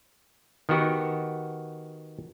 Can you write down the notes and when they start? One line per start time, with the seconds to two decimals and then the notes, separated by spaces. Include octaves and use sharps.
0.69 D#3 B3 F#4 G4